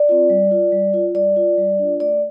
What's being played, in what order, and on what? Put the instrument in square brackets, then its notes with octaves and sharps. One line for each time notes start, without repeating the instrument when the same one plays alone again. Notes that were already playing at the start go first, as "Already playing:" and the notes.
Already playing: [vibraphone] D5
C4 F4
G3
F4
G3
F4
G3 D5
F4
G3
D4 F4
A3 D5